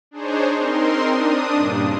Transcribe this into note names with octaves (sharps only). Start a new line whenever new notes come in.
D4 D#4 G#4 C5 C#5
C4 D#4 A#4 C6
D4 D#6
G2 A#2 C#3